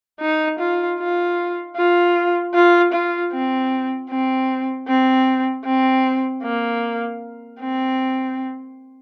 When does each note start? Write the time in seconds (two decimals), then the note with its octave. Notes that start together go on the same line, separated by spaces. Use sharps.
0.21 D#4
0.59 F4
0.99 F4
1.76 F4
2.54 F4
2.93 F4
3.32 C4
4.10 C4
4.88 C4
5.65 C4
6.44 A#3
7.60 C4